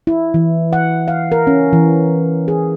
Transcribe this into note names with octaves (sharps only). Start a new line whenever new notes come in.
E4
E3
F#5
F5
A#4
C#4
E3
G#4